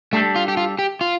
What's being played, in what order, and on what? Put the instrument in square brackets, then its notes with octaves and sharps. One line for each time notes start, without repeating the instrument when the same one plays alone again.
[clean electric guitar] G3 D4 A4 [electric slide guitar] A3
[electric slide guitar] F4
G4
F4
G4
F4